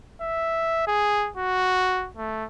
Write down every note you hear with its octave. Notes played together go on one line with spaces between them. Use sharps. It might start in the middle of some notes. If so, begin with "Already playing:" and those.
E5
G#4
F#4
A3